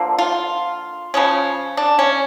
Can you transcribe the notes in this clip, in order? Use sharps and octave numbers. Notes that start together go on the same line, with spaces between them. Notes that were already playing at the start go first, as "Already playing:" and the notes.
Already playing: D3 F3 A#3
F4
C#3 F3 G#3 C#4
D4
C#4